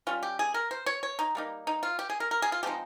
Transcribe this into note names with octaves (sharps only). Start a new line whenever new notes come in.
G3 C#4 F4
G4
G#4
A#4
C5
C#5
C#5
D#4
G3 A#3 D#4
D#4
F4
G4
G#4
A#4
A#4
G#4
F4
F3 G#3 C4 D#4 G4